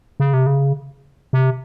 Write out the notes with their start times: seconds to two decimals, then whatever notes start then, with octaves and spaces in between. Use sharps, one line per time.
0.20 C#3
0.34 C3
0.46 C#3
1.33 C3